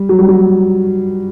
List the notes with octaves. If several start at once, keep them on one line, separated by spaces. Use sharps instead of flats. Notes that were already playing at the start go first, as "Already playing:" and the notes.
Already playing: G3
F#3
G3
F#3